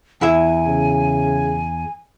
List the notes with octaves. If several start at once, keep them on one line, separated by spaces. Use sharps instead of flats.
E2 E4 E5 G#5
C#3